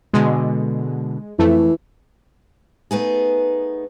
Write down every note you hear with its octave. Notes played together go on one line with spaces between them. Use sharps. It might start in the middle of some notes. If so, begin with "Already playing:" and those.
B2 D3 G#3
F2 E3 A3
A3 B3 D#4 G#4